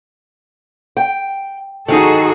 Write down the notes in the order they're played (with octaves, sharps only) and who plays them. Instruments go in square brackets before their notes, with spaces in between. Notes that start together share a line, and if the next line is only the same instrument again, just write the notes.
[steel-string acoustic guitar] G5
[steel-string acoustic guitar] D#3 D#4 [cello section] F#4 G#4 A4